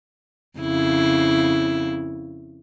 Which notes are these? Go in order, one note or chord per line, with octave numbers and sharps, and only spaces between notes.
F2 C#3 E4